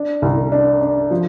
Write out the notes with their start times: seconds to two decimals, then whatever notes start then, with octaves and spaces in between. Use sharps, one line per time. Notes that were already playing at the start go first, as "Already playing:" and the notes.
Already playing: D4
0.22 C2
0.52 D4
0.81 D4
1.11 F3